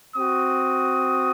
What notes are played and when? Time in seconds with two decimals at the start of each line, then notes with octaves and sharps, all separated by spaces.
0.15 C4 F#4 D#6